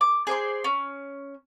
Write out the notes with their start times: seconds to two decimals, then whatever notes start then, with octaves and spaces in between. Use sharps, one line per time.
0.01 D6
0.27 G#4 C5 D5 C6
0.64 C#4